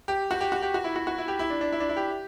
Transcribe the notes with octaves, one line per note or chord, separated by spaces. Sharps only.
G4
F#4
G4
F#4
G4
F#4
E4
F#4
F#4
E4
G4
E4
D4
D4
E4
D4
E4
G4